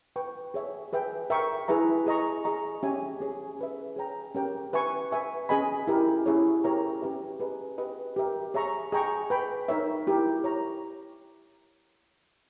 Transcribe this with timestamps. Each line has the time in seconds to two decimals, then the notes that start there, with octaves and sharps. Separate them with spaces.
0.16 B4 G5 C#6
0.54 G#4 C#5 E5
0.93 G#4 B4 E5 G5
1.30 A#4 E5 G5 C#6
1.68 E4 G#4 B4 E5 A#5
2.06 G#4 D#5 A#5 C#6
2.44 G#4 D#5 A#5 C#6
2.83 C#4 G4 C#5 E5 G#5
3.20 C#4 G#4 C#5
3.59 G#4 B4 E5
3.96 G#4 C#5 G5 A#5
4.35 C#4 G4 A#4 C#5 G5
4.73 B4 E5 G#5 C#6
5.11 B4 E5 G#5 C#6
5.49 C#4 G#4 D#5 G#5 B5
5.87 E4 G4 A#4
6.26 C#4 E4 G#4 C#5
6.64 G4 A#4 C#5 E5 A#5
7.02 C#4 G4 B4 E5
7.40 G#4 B4 D#5 A#5
7.78 G4 B4 D#5
8.16 G4 A#4 E5
8.54 G#4 C#5 E5 A#5 C#6
8.92 G#4 D#5 G5 A#5 C#6
9.30 B4 G5 B5
9.68 D#4 A#4 C#5 E5
10.07 E4 G4 A#4
10.44 A#4 C#5 E5 A#5